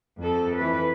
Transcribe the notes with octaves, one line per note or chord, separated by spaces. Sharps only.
F2 A4
E3 B4